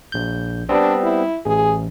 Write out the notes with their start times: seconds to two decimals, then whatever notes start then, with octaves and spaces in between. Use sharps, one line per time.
0.12 A#1 G6
0.69 G3 B3 C4 D4
1.03 E4
1.46 A1 G#4